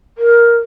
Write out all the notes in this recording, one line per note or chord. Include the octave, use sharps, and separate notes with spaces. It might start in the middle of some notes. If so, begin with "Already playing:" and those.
A#4